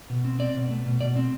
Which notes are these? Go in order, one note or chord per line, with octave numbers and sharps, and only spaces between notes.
B2
C4
C4 D5
B2
A3
B2
B2 D5
C4